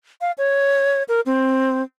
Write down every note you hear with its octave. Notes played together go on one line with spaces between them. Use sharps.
F5
C#5
A#4
C4